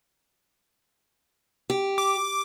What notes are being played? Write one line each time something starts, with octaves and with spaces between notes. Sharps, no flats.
G4
D6